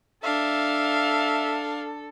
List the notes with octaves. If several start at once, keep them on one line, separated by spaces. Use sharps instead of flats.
D4 A4 E5 F5